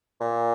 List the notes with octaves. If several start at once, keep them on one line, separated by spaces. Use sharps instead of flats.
A#2